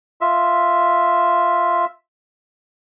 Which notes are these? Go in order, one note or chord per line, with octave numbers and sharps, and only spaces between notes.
F4 E5